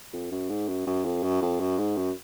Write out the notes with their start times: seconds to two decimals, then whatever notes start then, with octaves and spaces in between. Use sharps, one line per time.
0.13 F2
0.31 F#2
0.49 G#2
0.68 F#2
0.86 F#2
1.05 F2
1.23 F#2
1.42 F2
1.60 F#2
1.78 G#2
1.97 F#2